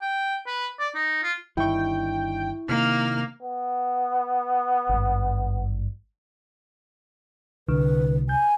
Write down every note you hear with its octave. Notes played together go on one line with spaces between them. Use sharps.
G5
B4
D5
D#4
F4
G1 G2 D#3 E4 G5 C#6
C3 D#3 A#3 F6
B3
G#1 G2
C2 D3 B4
G#5 G6